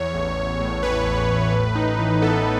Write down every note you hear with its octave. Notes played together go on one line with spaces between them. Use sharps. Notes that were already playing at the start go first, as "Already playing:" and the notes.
Already playing: E2 C#5
A1
A1
A2
E3 B4
A1
A1
A2
D#4
E3
B3 A4